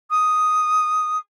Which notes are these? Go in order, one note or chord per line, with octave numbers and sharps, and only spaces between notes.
D#6